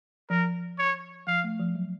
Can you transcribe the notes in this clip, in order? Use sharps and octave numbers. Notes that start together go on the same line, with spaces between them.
F3 A#4
C#5
F3 F5
A3
F3
F#3